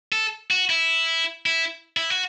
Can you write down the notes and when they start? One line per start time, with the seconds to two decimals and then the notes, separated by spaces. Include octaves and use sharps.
0.12 A4
0.51 F#4
0.70 E4
1.46 E4
1.97 E4
2.10 F#4